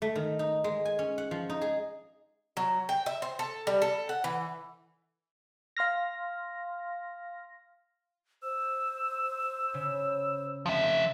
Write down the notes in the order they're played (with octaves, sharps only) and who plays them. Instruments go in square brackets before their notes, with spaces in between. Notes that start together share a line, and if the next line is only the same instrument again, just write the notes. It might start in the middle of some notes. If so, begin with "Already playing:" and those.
[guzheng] A3
D#3
D#4
G#3
G#5
C#4
F#5
F3
D#4
G#4
[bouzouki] F#3
G5
E5
C5
A4
G3
A4
F#5
E3
[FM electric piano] F5 C6 F6 A#6
[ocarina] C5 [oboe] E6
[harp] C#3
[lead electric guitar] F3 E5